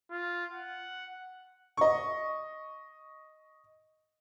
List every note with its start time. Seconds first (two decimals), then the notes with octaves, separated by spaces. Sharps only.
0.11 F4
0.52 F#5
1.77 D#5 C#6